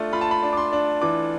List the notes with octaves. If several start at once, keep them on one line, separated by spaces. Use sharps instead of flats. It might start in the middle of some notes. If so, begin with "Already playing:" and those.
Already playing: A3 D4 F4
F4 B5
A5
B5
D4
D6
C6
D4
E3 D6